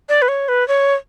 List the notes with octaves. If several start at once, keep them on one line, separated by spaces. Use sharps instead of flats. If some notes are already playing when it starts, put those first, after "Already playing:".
D5
B4
C#5
B4
C#5